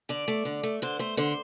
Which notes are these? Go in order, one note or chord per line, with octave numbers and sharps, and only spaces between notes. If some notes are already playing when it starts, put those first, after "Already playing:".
D3 D5
A3
D3
A3
D3 C5
A3 C5
D3 C5